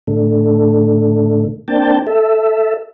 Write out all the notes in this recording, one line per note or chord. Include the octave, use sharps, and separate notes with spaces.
A2 D3 A3
A#3 C4 D4 G5 A5
A4 E5